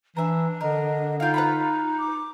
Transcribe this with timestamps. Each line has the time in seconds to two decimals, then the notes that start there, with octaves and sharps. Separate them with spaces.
0.17 E3 D4 E5 A#5
0.61 D3 A#4 D#5
1.20 D#4 F4 F5 G5
1.34 B4 A#5 B5
1.98 D6